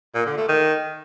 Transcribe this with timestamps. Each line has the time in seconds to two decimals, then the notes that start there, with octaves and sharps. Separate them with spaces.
0.15 A#2
0.26 D3
0.37 A3
0.49 D#3